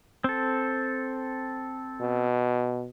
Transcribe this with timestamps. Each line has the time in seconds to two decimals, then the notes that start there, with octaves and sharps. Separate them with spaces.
0.24 C4 A4
2.01 B2